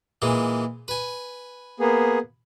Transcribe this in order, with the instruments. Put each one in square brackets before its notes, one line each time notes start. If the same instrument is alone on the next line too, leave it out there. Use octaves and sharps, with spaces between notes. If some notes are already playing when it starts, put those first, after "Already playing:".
[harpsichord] A#2 E3 G#3
B4 G#5
[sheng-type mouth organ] A#3 B3 G#4